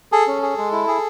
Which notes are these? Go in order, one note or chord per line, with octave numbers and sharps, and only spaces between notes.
G#4 A4
C#4
G#4
G#3
E4
G#4